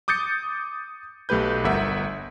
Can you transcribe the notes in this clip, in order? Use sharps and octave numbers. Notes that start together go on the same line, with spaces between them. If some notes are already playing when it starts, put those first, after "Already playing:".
D6 D#6 G6 A6 C#7
B1 A3 G4 B4 G6
G1 A#4 E5 F#5